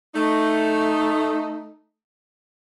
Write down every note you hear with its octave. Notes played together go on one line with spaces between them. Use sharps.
A3 D#4